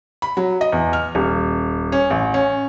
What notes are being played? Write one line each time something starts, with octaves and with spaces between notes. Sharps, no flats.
B5
F#3
D#5
E2
F6
D#1
C#4
A1
C#4